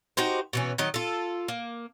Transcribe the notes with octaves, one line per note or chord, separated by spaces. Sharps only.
D#4 F#4 G4 C5
B2 E3 C#4
D#3 F#3 D#5
F4 A4
A#3